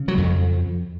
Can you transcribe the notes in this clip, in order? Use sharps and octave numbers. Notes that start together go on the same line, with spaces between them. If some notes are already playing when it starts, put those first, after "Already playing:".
Already playing: C#3
F#3
F2